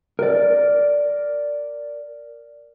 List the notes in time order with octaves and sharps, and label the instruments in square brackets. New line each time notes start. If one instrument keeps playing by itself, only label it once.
[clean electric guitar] A#4 D5